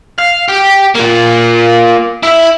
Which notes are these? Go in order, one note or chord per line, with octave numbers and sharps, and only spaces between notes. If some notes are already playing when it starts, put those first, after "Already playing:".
F5
G4
A#3 F4
E4 E5